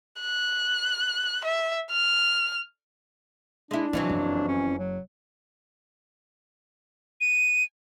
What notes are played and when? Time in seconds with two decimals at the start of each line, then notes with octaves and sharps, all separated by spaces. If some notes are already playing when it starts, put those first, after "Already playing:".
0.21 F#6
1.45 E5
1.91 F6
3.71 G#3 D4 E4
3.93 F2 D3 E3 F#3
4.09 F#1
4.48 C#4
4.78 F#3
7.21 D#7